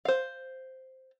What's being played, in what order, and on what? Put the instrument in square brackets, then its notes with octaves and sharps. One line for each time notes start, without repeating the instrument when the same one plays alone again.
[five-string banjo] C5 F5